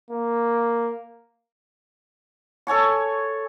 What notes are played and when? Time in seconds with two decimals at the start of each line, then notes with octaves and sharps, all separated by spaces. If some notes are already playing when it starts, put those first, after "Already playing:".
0.10 A#3
2.67 A4 C#5 G#5 C#6